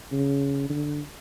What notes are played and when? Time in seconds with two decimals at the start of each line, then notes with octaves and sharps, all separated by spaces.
0.12 C#3
0.70 D3